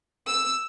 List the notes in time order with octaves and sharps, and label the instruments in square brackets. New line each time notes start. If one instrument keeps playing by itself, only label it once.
[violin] E6